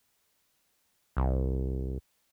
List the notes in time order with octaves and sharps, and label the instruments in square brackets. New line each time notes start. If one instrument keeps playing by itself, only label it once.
[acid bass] C2